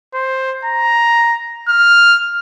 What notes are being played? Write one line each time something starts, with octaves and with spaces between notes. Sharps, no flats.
C5
A#5
F6